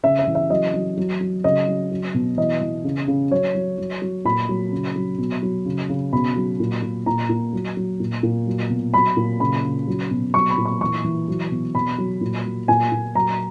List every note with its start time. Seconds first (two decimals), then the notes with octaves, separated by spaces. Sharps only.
0.03 C#3 E5
0.19 E5
0.27 E3
0.35 E5
0.50 F#3 D#5
0.74 F#3
0.97 F#3
1.21 F#3
1.44 C#3 D#5
1.68 F#3
1.91 F#3
2.14 B2
2.37 E3 D#5
2.61 E3
2.84 C#3
3.08 C#3
3.31 F#3 C#5
3.55 F#3
3.78 F#3
4.02 F#3
4.25 A#2 B5
4.49 F#3
4.72 C#3
4.96 F#3
5.18 B2
5.42 F#3
5.66 C#3
5.89 C#3
6.13 B2 B5
6.36 F#3
6.60 A#2
6.83 A#2
7.06 A#2 A#5
7.30 A#2
7.53 F#3
7.77 F#3
8.00 A#2
8.23 A#2
8.47 F#3
8.70 B2
8.93 F#3 B5
9.17 A#2
9.40 C#3 B5
9.64 C#3
9.87 F#3
10.11 B2
10.34 F#3 C#6
10.50 B5
10.58 A#2
10.65 C#6
10.81 E3 C#6
11.04 E3
11.28 F#3
11.51 B2
11.75 B2 B5
11.98 F#3
12.21 A#2
12.45 F#3
12.68 A#2 G#5
12.92 A#2
13.15 F#3 A#5